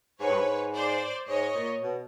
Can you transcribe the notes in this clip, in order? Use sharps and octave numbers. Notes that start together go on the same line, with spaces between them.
G#2 B4 C#5
G2
G#2
C5 D5
G#2 C#5 D#5
A#2
B2